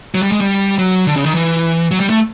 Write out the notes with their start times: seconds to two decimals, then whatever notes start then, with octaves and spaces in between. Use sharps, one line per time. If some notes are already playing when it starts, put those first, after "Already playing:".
0.14 F#3
0.22 G3
0.32 G#3
0.41 G3
0.79 F#3
1.07 D3
1.16 C#3
1.25 D#3
1.35 E3
1.91 F#3
2.00 G3
2.10 A3